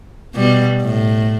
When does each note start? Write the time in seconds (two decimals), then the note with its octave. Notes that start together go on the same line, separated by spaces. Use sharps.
0.35 B2 G3
0.81 A2